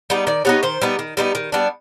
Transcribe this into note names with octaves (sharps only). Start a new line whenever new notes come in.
G3 B3 D#4
D#3 D5
G3 B3 D#4 C#5
D#3 C5
G3 B3 D#4
D#3
G3 B3 D#4
D#3
G3 B3 D4